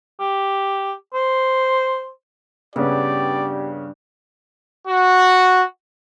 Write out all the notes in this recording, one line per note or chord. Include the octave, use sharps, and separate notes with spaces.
G4
C5
G2 C#3 B3 C#4 G4 D5
F#4